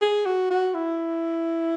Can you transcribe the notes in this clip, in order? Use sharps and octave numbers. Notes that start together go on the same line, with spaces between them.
G#4
F#4
F#4
E4